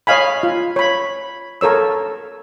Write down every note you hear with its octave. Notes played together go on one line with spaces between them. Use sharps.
C#5 D#5 F5 G#5 B5
F4
C#5 B5
A4 A#4 C#5 E6